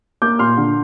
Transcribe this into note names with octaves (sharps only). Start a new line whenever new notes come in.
A#3 D6 G6
A#2 C6 F6
D3